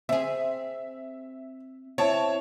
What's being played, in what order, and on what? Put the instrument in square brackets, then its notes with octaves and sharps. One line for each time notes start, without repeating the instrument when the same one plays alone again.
[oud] C4 G#4 [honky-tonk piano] E5
[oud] C4 [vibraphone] E4 E5 [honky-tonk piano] C#5 A5